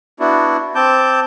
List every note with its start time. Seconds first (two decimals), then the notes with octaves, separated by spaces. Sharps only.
0.20 B3 D4 E4 F#4
0.75 C4 A5 D6 G6